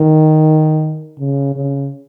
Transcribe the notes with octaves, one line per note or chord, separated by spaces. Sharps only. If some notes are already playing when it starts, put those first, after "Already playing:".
Already playing: D#3
C#3
C#3